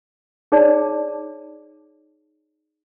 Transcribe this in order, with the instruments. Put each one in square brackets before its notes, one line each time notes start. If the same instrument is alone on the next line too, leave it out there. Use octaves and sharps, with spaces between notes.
[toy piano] D#4 G#4 C#5 D5 A5